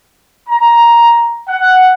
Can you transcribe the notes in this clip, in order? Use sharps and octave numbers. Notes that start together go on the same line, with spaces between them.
A#5
F#5